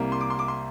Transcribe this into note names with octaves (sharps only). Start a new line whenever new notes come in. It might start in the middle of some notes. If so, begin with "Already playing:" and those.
Already playing: C2 C3 G3 A#3
C6
D6
C6
D6
C6